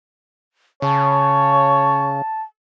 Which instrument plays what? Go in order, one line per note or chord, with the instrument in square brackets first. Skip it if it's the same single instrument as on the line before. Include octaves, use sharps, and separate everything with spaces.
[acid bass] C#3 [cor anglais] C#5 [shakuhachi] A5